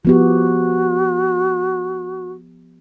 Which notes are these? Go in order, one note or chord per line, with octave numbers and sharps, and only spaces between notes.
F3 B3 F#4 G4